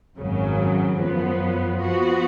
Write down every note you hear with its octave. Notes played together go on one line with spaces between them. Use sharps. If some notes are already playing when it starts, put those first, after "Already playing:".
G#1 F#2 C#3 F#3
F#2 F3 B3
F3 B3 F#4